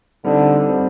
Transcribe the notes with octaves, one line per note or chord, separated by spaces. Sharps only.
D3 G3 C4 D#4
G3 C4 D#4